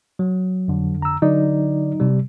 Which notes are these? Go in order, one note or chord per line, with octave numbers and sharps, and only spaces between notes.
F#3
F2 D3
A#5 E6
D3 F#3 D#4 D5
C3 G3